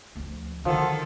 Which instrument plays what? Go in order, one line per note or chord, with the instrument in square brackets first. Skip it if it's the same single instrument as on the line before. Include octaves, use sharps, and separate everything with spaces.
[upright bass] D2 F3
[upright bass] D3 [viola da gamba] D#3 A4 [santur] F3 [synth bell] F#4 F#5